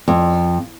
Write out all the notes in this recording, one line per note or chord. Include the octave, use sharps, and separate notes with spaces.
F2